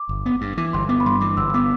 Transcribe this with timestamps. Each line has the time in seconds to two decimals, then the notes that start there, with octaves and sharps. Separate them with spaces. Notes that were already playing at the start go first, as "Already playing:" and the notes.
Already playing: D6
0.09 G1
0.26 B3
0.41 G2
0.57 E3 D6
0.73 G1 C6
0.89 B3 D6
1.00 B5
1.06 G2 C6
1.21 E3 D6
1.37 G1 E6
1.54 B3 D6